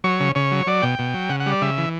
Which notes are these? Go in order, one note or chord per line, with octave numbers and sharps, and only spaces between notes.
F#3 C#5
C#3
C#3 C#5
F#3
F#3 D5
B2 G5
B2
F#3
C#3 F#5
F#5
G3
D5
C#3 E5
E3